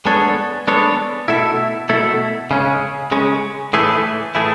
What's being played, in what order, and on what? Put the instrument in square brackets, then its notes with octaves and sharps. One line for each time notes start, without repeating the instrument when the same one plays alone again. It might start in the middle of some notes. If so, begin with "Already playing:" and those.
[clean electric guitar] G#3 B3 D4 A4 C#5
G#3 B3 D4 A4 C#5
B2 A3 E4 A4 E5
B2 A3 E4 A4 E5
C#3 G#3 C#4
C#3 G#3 C#4
A2 E3 A3 E4 G#4
A2 E3 A3 E4 G#4